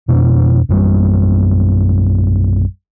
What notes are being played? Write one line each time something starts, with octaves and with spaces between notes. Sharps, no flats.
F2 B2 D4
A#1 F#2 G3